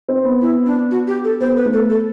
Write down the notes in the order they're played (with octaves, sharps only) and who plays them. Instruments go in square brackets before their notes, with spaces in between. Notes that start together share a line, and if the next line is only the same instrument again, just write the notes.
[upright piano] C4
B3
[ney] E4
D4
F#4
G4
A4
[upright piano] B3 [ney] C5
[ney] B4
[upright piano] A3
[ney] A4
A4